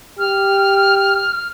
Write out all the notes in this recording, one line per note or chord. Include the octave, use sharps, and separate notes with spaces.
G4 F6